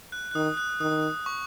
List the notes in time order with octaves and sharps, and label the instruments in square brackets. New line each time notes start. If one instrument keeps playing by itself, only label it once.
[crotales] F#6
F#6
[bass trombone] D#3 [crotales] D#6
[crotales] F#6
[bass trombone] D#3 [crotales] D#6
[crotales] C#6